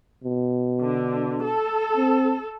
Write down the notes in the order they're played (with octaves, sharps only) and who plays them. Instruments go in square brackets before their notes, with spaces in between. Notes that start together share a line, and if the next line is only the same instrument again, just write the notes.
[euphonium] B2
[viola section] D3
A4
[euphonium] C4